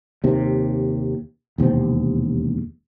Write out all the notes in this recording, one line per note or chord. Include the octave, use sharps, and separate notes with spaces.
D#2 C3
E1 D#2 C3 C4